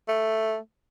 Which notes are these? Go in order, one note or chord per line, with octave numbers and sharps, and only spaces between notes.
A3